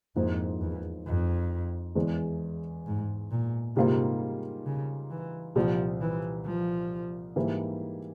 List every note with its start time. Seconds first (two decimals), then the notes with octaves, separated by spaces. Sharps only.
0.15 F2 G#2 F3 A#3 E4
0.61 E2
1.06 F2
1.95 E2 E3 G#3
2.86 G#2
3.31 A#2
3.76 G#2 C3 G3 A#3 F4
4.66 C#3
5.10 E3
5.56 C2 A#2 F3 G3 C4
6.01 E3
6.46 F3
7.36 G#2 E3 G3 A#3 E4